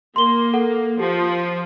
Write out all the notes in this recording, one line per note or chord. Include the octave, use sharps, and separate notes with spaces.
A#3 C6 G7
A4 F#5
F3 G4